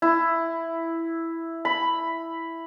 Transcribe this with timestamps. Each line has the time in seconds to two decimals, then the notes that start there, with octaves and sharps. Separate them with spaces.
0.02 E4
1.65 B5